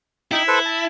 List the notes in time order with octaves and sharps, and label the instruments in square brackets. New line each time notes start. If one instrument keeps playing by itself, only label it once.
[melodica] D#4 G5 [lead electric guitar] E4
[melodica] A4 B4 C5
A5